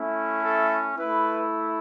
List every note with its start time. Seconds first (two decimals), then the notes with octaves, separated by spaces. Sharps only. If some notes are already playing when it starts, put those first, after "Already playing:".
Already playing: A3 C#4 E4
0.41 A4
0.96 A3 E4 B4